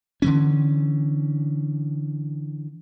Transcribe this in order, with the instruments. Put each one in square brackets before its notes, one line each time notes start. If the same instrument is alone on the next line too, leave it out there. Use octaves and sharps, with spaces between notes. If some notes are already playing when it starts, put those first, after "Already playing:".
[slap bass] D3 E3 C#4